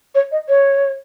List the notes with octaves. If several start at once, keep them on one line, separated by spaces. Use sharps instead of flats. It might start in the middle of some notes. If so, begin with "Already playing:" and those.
C#5
D#5
C#5